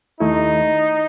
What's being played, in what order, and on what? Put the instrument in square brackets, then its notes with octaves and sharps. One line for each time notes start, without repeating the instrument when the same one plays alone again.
[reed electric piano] D#2 D#3 A3 E4 [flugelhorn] D#4